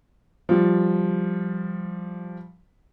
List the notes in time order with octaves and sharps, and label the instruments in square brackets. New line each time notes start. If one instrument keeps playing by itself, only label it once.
[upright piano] F3 G3